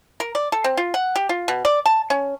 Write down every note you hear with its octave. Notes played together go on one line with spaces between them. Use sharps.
A#4
D5
A4
C4
F4
F#5
G4
F4
B2
D5
A5
C#4